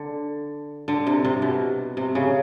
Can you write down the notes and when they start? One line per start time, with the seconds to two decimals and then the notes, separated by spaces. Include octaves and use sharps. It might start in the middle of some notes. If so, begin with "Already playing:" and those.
Already playing: D3
0.88 D3
1.07 C3
1.25 C3
1.42 B2
1.97 C3
2.15 C#3